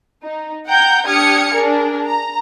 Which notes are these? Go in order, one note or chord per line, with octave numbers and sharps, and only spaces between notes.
D#4
F#5 G5 A#5 G6
D4 G4 D#6 F6 G#6 C#7
D4 G#4 A#4
A#5